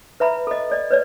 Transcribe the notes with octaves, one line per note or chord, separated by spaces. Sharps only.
B4 E5 A#5 B5
A4 D#5
A4 D5 D#5
B4 C#5 D5